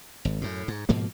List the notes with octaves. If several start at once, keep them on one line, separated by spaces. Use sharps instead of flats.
G#1
F#2 A2
G#2
G#2 B2 F3 A#3